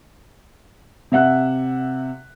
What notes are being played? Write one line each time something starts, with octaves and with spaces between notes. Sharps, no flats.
C3 E5 F#5 F#6